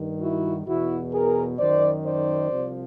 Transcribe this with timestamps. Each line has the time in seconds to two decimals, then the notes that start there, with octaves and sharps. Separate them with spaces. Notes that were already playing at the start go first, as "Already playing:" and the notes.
Already playing: G2 D#3
0.20 E4 F#4
0.66 E2 B2 E4 F#4
1.13 G#4 A#4
1.58 F#2 D#3 C5 D5
2.04 C5 D5
2.50 C2 C3 F3